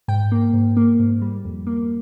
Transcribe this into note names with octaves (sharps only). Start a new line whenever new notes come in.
G#2 G5
A#3
G#2
A#3
G#2
G3
F2
A#3